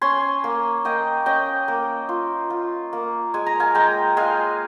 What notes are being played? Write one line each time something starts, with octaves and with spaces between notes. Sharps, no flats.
C#4 G#5 C6
A#3
A#3 D#5 G5
C#4 D#5 G5
A#3
F4
F4
A#3
G#3 G#5
A#5
F5 G#5
G#3 G5 A#5
G#3 F5 G#5